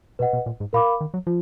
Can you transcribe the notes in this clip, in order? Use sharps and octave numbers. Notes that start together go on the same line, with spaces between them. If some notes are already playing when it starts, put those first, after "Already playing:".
B2 B4 D#5 F#5
B2
A#2
G#2
A#2 A#4 F5 B5 D6
D#3
F#3
F3 F4